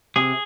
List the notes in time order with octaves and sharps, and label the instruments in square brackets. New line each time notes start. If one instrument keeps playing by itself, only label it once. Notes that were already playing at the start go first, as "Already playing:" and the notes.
[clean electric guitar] C3 G#4